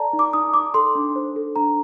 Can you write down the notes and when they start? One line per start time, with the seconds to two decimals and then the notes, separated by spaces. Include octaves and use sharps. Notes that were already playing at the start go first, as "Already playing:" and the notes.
Already playing: A4 D5 A5 A#5
0.13 D#4
0.19 D6
0.33 D#4 D#6
0.54 D#4 D6
0.74 A4 C6
0.95 D4
1.16 C5
1.36 A4
1.56 D4 A#5